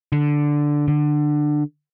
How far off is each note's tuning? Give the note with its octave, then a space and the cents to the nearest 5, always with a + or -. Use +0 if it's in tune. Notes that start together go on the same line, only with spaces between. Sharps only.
D3 +0
D3 +20